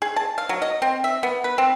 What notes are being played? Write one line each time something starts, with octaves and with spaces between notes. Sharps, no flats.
G#4
A5
F5
F#3
D#5
C4
E5
B3
B4
C4